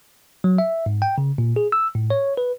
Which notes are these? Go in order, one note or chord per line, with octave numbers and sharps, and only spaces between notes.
F#3
E5
G#2
G5
C#3
A#2
G#4
E6
A2
C#5
B4